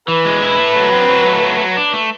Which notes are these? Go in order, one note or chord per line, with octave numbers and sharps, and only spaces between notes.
E3 B4
G#3
E4
A3
F#3
C4
F#3
A3
F#3
F#3
D4
A3